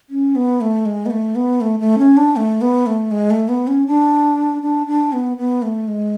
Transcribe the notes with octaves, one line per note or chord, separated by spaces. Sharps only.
C#4
B3
A3
G#3
B3
A3
B3
A3
A3
C#4
D4
A3
B3
A3
G#3
A3
B3
C#4
D4
D4
D4
B3
B3
A3
G#3